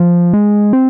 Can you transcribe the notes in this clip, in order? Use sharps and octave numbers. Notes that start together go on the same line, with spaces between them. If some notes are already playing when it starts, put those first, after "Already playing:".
Already playing: F3
G#3
C4